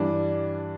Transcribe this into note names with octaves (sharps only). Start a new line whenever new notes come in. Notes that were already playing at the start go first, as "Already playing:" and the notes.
Already playing: G2 E3 G3 D4